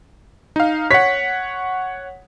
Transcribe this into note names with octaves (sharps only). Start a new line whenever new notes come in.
D#4 F5
C#5 F#5 B6